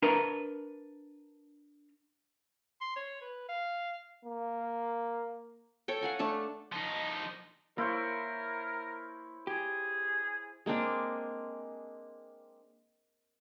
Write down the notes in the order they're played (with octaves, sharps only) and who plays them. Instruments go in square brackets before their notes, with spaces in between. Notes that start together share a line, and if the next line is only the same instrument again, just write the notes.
[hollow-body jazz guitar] D4 A#4 B4 A#5
[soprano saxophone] C6
C#5
B4
F5
[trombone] A#3
[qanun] A4 C#5 G5
F5 F#5 G#5 A#5
A3 D4 A5
[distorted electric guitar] F3 D#4
[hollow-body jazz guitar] A#3 [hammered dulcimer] E4 C5 C#5 [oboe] A#4
[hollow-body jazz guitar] G4 [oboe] G#4
[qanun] G#3 A#3 C4 D4